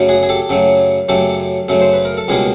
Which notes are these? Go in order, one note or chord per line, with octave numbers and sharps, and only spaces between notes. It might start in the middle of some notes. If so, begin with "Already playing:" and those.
Already playing: F#2 C#3 F#3 A3
F#4 G#4
G#4
G4 A4
F#2 C#3 F#3 A3
F#2 C#3 F#3 A3 G4 A4
F#2 C#3 F#3 A3
C5
B4
A#4
A4
C#2 B2 G3 A#3 F#4 G#4